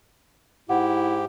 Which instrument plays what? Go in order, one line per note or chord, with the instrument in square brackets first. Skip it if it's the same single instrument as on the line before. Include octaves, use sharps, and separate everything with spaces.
[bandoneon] G#2 G4 [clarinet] E4 [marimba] F#5